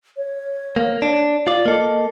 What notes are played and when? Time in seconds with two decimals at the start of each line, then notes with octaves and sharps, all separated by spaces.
0.17 C#5
0.76 A#3
1.02 D4
1.47 F4 D5
1.66 A#3 A4 D#5